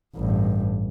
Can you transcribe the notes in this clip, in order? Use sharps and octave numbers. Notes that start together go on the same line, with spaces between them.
A1 G2